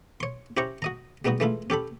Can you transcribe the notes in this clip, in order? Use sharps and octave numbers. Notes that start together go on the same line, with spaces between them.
C#5 C6
C#4 E4 G4 C5 A#5 C#6
F#4 D#5 A#5
G3 G#3 B3 D#4 F#4
E3 G#3 A3 E4 F4
C#4 G4 A4 B5